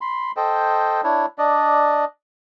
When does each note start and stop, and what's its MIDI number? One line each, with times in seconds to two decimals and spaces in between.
0.01 0.32 83
0.01 0.32 84
0.37 1.01 69
0.37 1.01 72
0.37 1.01 75
0.37 1.01 79
1.04 1.26 62
1.04 1.26 64
1.04 1.26 73
1.38 2.05 62
1.38 2.05 74
1.38 2.05 75